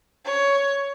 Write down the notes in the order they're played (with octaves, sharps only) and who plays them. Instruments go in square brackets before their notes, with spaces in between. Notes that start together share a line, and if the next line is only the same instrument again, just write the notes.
[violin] C#5